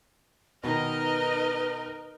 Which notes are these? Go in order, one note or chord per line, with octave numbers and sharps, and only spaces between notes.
B2 D#3 D#4 A#4 B4 D#5 F6